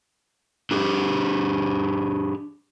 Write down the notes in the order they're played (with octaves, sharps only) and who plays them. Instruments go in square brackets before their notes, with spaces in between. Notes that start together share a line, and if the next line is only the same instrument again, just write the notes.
[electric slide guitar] D4 G4 G#4